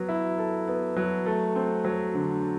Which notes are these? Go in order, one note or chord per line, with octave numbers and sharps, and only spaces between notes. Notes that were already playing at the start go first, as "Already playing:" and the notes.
Already playing: F#3 B3
E4
A4
B3
F#3
A3
C4
F#3
D3